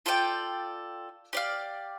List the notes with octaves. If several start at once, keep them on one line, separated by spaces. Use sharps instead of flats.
F4 A4 D5 G5
G4 D5 F5